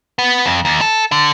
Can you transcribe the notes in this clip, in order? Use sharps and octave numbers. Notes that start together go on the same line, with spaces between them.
B3
F2
D#2
A4
D3